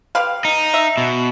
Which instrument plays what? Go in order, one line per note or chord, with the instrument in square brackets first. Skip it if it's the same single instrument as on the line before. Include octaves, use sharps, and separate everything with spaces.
[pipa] G4 B4 F5
[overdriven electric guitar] D#4
[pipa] E5
[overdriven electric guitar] B2